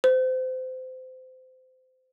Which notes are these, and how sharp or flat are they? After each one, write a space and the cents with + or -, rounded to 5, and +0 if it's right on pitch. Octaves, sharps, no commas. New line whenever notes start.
C5 -25